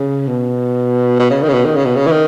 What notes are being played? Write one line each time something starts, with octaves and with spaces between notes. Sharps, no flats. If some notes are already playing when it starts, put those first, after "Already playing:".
Already playing: C#3
B2
B2
C#3
D#3
C#3
B2
D#3
C#3
B2
C#3
E3
D#3